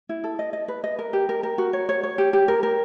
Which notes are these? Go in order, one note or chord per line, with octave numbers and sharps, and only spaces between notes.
E4
A4
D#5
D#5
B4
D#5
A#4
G4
A#4
A#4
F#4
C#5
C#5
C#5
G4
G4
A#4
A#4